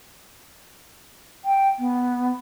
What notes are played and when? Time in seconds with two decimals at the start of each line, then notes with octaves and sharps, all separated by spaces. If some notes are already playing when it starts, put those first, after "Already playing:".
1.45 G5
1.79 B3